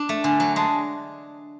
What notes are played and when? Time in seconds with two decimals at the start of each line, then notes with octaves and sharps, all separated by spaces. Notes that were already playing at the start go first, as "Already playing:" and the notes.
Already playing: D4
0.09 A3
0.24 D3 G#5
0.40 F#3
0.56 G#3 A5